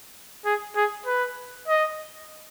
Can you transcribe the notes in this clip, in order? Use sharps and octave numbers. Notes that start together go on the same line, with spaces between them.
G#4
G#4
B4
D#5